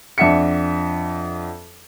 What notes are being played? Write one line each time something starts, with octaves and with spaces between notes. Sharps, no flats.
F2 D4 E5 F#5 B6 C#7